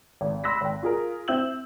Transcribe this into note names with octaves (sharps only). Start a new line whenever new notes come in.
G#1
B5 C6 E6 F#6 A#6 B6
G#1 G5
F4 G#4 A#4
C4 E4 E6 G6 F#7